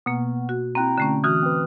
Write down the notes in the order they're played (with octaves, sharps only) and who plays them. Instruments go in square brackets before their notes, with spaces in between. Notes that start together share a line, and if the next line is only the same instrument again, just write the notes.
[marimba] B2 A#3 [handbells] B3
[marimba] F#4
[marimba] C4 F#6 [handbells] E4 G5 A#5
[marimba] D3 A3 C#4
[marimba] E3 F#4 [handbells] D#6 F6 F#6
[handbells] C4 B4